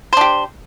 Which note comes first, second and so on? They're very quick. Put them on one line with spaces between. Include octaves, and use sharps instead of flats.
C5 D4 G4